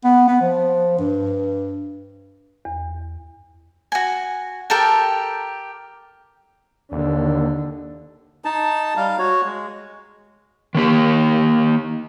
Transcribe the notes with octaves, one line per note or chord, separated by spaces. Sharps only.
B3
B3
F3
G2
E2
F#4 G#5
G4 A4 A#4 G5
D#2 D3
D#4 A5
G3 F5
F#4 C#5
G#3
D#3 A#3 G4